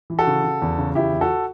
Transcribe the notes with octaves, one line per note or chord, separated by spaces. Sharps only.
E3
F#4 A4
C#3
C#3
E2
C#3
E2 E4 G4
E2
F#4 A4